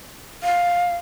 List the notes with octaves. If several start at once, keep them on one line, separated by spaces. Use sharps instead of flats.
F5